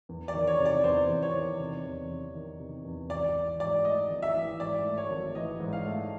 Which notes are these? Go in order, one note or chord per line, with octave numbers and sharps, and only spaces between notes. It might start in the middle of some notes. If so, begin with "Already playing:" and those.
E2
D5
D#3
C#5
C3
D5
E2 C5
E2
C#5
D#3
C3
E2
E2
D#3
C3
E2
G#1 D5
E3
G#2 D5
A3 D#5
G#1
E5
E3
G#2 D5
A3
C#5
G#1
E3 D#5
G#2
F5
A3